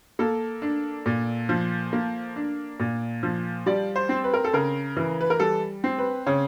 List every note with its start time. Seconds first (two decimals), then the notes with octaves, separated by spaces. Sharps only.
0.19 A#3 A4
0.62 D4
1.06 A#2
1.49 F3
1.93 A#3
2.36 D4
2.80 A#2
3.23 F3
3.66 G3 D5
3.96 C5
4.09 C4
4.24 B4
4.34 A#4
4.44 A4
4.53 C#3 A#4
4.97 E3
5.21 B4
5.30 A#4
5.40 G3 A4
5.84 C4
5.98 B4
6.27 C#3 C#5